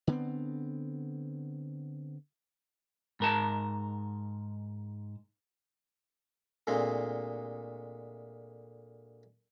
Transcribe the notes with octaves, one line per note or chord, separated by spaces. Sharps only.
D3 B3 C4
G#2 A#4 A5
D2 A#2 G#3 C4